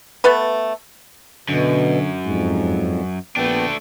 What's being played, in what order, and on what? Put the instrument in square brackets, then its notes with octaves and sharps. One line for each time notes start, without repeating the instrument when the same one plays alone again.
[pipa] A3 B3 A4 B4
[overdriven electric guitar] F#2 [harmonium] B2 [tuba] D3
[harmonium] F2 [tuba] G#2
[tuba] A#1 [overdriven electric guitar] A3 D4 [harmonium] B3 G5